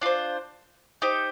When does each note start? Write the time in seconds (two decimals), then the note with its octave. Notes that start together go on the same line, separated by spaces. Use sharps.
0.01 D4 F4 C5
1.02 D#4 G4 C5